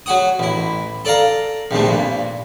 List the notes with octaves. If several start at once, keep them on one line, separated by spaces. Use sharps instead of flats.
F#3 F#4 F#5 D#6
A1 E4
A4 D5 F5 A#5
A#1 D#2 C3 A3
G2 A#2